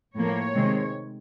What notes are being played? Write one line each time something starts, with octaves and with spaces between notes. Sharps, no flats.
A2 F3 A#3 C#5
C3 D#3 G#3 C4